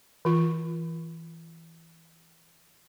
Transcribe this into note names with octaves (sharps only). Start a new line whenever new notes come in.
E3 F4